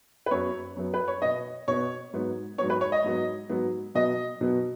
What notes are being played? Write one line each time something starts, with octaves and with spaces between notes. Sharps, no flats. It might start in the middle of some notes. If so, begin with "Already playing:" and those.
B4
F#2 F#3 B3 C#5
F#2 F#3 B3
B4
C#5
B2 B3 D#5
B2 B3 C#5
G#2 F#3 B3
G#2 F#3 B3 C#5
B4
C#5
D#5
G#2 F#3 B3
G#2 F#3 B3
B2 F#3 B3 D#5
B2 F#3 B3